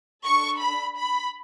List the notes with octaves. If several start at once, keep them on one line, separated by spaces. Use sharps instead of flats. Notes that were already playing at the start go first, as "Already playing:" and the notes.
D4 A4 C#6
B5
B5